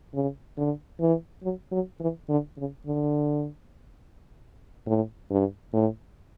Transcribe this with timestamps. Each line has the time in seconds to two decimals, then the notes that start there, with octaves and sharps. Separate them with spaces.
0.14 C#3
0.57 D3
1.00 E3
1.43 F#3
1.72 F#3
2.00 E3
2.29 D3
2.58 C#3
2.86 D3
4.87 A2
5.30 G2
5.73 A2